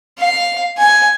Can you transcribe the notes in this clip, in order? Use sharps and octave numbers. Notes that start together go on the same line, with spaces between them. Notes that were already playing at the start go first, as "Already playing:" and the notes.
F5
G#5